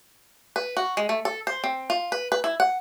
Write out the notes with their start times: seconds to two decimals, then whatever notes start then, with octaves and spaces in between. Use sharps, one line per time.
0.56 B4
0.77 F#4
0.97 G#3
1.09 A3
1.25 A4
1.47 C5
1.64 C4
1.90 F4
2.12 B4
2.32 B4
2.44 E4
2.60 F#5